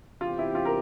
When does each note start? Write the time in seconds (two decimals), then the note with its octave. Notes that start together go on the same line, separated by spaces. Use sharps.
0.20 E2 C3 G3 C4 F4 G4
0.39 E4
0.55 F4
0.65 A#4